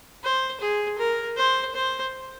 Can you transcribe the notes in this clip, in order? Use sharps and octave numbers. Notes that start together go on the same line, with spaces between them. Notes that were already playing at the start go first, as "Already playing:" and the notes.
C5
G#4
A#4
C5
C5